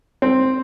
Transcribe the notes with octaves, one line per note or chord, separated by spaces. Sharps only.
C4